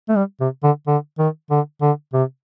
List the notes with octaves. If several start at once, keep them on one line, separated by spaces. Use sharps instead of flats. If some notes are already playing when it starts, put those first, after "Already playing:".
A3
G3
C3
D3
D3
D#3
D3
D3
C3